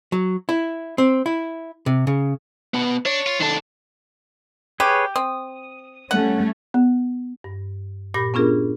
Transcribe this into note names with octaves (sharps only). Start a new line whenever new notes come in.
F#3
E4
C4
E4
C3
C#3
B2 B3
D4 C#5
F4
D#3 D4 A4
G4 G#4 B4 C#5
C4 D#6
G3 A3 C#4 F#5
B3
G2
A#2 G4 B5 A#6
B3 C#4 D4 F4 G#4 A#4